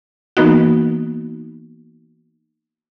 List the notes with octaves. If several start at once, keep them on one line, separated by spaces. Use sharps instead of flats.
E3 A#3 B3 D#4 F#4